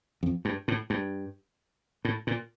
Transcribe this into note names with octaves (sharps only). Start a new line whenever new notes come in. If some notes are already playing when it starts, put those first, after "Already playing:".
F2
G2
A2
G2
A2
A#2